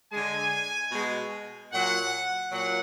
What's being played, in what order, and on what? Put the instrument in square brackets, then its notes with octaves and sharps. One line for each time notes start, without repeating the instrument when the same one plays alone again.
[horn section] D3 G#3 G#5
B2 G#3
A#2 F#3 F#5
A#2 F#3 F#5